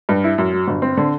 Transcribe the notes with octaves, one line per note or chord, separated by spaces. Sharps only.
G2
E4
F#2
F#3
G1
C4
D3